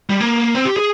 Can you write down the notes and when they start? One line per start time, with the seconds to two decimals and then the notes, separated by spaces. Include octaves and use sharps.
0.10 G3
0.20 A#3
0.55 C4
0.65 G4
0.77 G#4